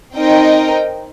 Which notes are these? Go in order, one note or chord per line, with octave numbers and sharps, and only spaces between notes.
C4 D#4 A#4 D#5 G5